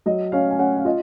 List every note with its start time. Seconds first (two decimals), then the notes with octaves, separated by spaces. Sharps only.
0.06 F#3 D#5
0.32 C#4 F5
0.51 G#5
0.59 C#4 F#5
0.77 F5
0.85 F4 D#5